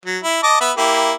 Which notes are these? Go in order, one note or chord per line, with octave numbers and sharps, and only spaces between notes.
F#3
E4
D#5 A5 D6
B3 E5 B5
A#3 E4 G4